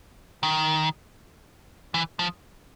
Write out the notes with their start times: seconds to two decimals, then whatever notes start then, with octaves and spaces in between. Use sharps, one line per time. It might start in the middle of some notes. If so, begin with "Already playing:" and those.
0.43 D#3
1.94 E3
2.19 F3